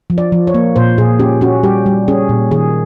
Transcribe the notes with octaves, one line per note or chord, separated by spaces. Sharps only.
F3
D5
F3
C#5
A#3
A#2 C5
A#2 G#4
C#4 G4
C#4 F#4
G3 G4
G3
C#4 G#4
A#2
D#3 G#4